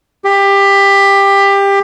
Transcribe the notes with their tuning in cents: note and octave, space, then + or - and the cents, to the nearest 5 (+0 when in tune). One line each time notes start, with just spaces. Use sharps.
G4 +20